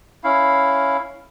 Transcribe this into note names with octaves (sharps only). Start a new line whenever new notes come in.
C#4 E4 F5